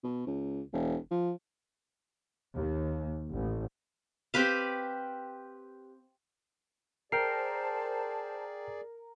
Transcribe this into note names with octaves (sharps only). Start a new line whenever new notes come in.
B2
C#2
E1
F3
D#2
A1
C4 G4 B4 F5
G#4 A#4 C5 D5 G5 A5 F6 C7